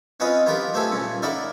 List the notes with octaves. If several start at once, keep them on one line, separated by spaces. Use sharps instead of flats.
C4 C#4 F4 B4 D#5 F5
B3 F4 G4 A#4 B4
A3 C4 G4 A4 G#5
A#2 C#3
D#4 A#4 D5 E5 F#5 B5